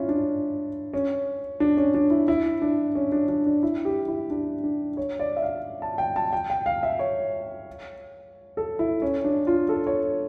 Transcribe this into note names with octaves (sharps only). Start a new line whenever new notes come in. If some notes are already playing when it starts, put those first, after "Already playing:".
Already playing: C#4 E4 F4
D4
C#4
D4
C#4
D4
E4
E4
D4
C#4
D4
D4
D4
E4
G4
E4
D4
D4
C#5
D5
E5
F5
A5
G5
A5
G5
G5
F5
E5
C#5
A4
E4
C#4
D4
F4
A4
C#5